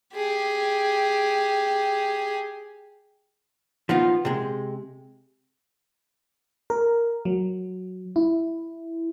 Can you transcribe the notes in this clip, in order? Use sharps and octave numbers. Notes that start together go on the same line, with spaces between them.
G4 G#4
F3 B3 D#4 F4
C3 G#3
A#4
F#3
E4